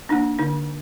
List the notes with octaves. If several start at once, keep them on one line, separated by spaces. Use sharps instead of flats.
A#3 D4 D#4
D3 D#4